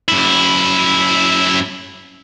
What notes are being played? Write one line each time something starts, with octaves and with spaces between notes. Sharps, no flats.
F#2 E4